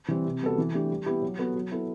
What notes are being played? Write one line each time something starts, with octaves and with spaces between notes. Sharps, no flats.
E3 G3 C4
C3
G3 B3 F#4 A4
E3
A3 D4 G4
G3
B3 E4 G4
F#3
B3 F#4 A4
F#3
B3 E4 A4